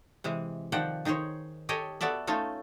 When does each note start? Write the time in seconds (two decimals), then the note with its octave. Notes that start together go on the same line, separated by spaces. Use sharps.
0.24 C3 E3 G#3
0.72 D#3 F3 D5 F#5 G5
1.05 D#3 D#4 G#4 C5 C#5
1.69 G4 A4 C#5 D#5 G5 G#5
2.01 B3 F#4 A4 D5 E5
2.27 A3 C#4 D#4 F4 A4